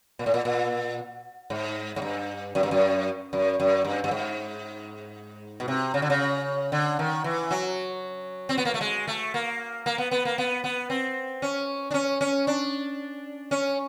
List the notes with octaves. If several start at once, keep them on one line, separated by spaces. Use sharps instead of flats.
A#2
A2
A#2
A#2
G#2
G#2
G2
F#2
G2
F#2
F#2
F#2
G2
G2
G#2
B2
C3
C#3
D3
C#3
D3
D#3
E3
F#3
C4
B3
A#3
A3
G#3
A3
A#3
A#3
B3
B3
A#3
B3
B3
C4
C#4
D4
C#4
C#4
D4
C#4